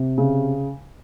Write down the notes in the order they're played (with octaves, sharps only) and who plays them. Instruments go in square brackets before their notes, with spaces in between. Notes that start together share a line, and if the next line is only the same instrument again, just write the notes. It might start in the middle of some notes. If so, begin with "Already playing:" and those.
Already playing: [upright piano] C3
C#3